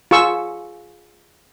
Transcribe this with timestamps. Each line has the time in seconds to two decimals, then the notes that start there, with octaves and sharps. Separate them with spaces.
0.11 F4 G#4 C#6 E6